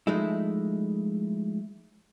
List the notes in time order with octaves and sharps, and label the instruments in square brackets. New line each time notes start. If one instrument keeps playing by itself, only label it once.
[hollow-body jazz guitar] F3 G#3 A3 D#4 E4